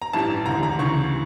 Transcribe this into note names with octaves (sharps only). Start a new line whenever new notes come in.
A#5
A1 G2 E3 A5
E1 D2 D3 A#5
A#5
D2 C#3 E3 C#6